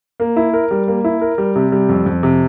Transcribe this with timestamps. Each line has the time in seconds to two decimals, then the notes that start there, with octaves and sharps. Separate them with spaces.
0.20 A#3
0.36 E4
0.53 A#4
0.71 G3
0.88 A#3
1.04 E4
1.21 A#4
1.38 G3
1.56 C3
1.72 G3
1.89 F2
2.06 F2
2.23 C3